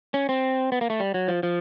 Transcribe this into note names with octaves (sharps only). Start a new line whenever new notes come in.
C#4
C4
B3
A#3
A3
G3
F#3
F3
F3